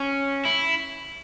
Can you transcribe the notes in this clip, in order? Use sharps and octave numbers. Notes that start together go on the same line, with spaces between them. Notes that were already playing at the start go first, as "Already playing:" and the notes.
Already playing: C#4
E4